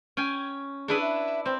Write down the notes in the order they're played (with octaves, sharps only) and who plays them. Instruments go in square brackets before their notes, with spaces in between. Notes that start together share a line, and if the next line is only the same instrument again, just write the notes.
[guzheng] C#4 G5 G#5
[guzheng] D4 E4 B4 [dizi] G#4
[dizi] E5
[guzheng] C4 [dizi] C5